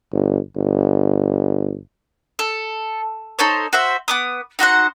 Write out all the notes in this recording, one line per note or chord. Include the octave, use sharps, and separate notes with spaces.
G1
G1
A4
D#4 A4 C5 C#5
F#4 C5 E5
B3 D6 D#6
D#4 F#4 C5 F#5